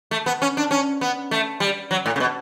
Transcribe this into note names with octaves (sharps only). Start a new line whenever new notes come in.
A3
B3
C#4
D4
C#4
B3
A3
G3
F#3
A2
C#3
B2